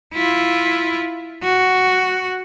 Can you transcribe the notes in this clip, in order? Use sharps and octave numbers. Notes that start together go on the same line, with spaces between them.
E4 F4
F#4